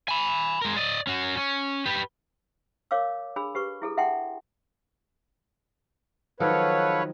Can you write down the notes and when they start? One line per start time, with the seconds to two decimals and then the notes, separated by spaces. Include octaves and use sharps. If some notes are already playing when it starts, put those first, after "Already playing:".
0.08 G#5 B5
0.61 G#3 A#4
0.76 D5 D#5
1.07 C#4 F#4
1.37 C#4
1.86 G4 B4
2.91 A#4 C#5 F5 D6 E6
3.36 D4 G#4 B5 E6
3.55 G4 B4 C#6
3.82 E4 G#4 A4
3.97 E5 F#5 G5 A5 C6
6.40 D#3 F3 F#3 A4 B4 C#5 F5 F#5